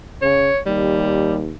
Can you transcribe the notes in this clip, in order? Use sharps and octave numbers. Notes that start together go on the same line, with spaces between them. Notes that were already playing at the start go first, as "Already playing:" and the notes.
C#3 C#5
D#2 G3